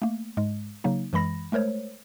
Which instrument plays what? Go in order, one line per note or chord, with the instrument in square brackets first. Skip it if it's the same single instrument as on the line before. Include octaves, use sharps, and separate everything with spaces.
[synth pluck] A3 A#3
G#2 G#3
C#3 F#3 A#3 D#4
F#2 E3 G#3 B5 A#6
G#3 A3 A#4 C5 C#5